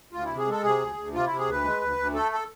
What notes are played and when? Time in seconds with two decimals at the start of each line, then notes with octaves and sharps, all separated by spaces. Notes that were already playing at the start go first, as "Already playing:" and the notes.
0.13 D2 F4
0.25 C3 E4
0.38 G#4
0.46 G#3 A4
0.63 C3 G#4
0.80 D2
0.96 D2
1.13 C3 F4
1.26 C3 E4
1.39 G#4
1.46 D2 B4
1.64 G#3
1.81 D2
1.97 D2
2.14 A3 A4
2.32 A4